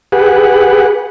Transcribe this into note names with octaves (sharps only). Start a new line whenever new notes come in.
G4 G#4 B4 F#5